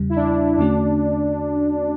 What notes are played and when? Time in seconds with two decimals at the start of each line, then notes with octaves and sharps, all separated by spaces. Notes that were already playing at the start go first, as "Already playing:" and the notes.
Already playing: E2 C#3 G3
0.10 E4
0.16 D4
0.30 D4
0.44 E4
0.58 E2 D3 A3 C#4 D4 F#4